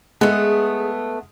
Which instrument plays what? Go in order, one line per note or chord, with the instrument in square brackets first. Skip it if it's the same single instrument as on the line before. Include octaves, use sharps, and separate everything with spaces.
[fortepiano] G#3 [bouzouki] A3 B3 [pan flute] G#4